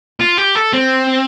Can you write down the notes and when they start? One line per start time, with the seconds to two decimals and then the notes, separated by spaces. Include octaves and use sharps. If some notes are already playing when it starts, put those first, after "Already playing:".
0.21 F4
0.38 G4
0.56 A4
0.73 C4